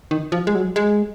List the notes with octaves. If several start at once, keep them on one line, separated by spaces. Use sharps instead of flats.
D#3
F3
G#3
F#3
G#3